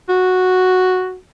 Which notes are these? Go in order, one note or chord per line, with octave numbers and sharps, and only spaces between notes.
F#4